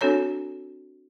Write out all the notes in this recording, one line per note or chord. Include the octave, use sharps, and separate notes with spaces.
C4 D4 F#4 A4 C#5 A#5